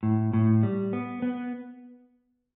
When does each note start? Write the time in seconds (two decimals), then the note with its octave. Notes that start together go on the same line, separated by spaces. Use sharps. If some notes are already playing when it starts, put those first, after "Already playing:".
0.03 A2
0.33 A2
0.63 G3
0.93 B3
1.22 B3